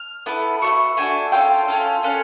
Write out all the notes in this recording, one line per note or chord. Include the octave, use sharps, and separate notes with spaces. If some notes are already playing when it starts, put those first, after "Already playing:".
Already playing: F6
B3 E4 A4
A3 D4 F#4 C#6
A3 D4 F#4 G#5
C#4 F4 A4 G5
C#4 F4 A4
C#4 F4 A4 F#5